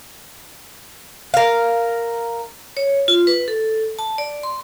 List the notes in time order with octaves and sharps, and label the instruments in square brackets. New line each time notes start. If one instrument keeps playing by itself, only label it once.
[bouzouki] A#4 F5
[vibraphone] C#5
F4
B4
A4
A5
D5
C6